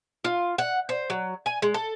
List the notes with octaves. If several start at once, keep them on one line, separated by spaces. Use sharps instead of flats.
F4
F#5
C5
F#3
G#5
G#3
A4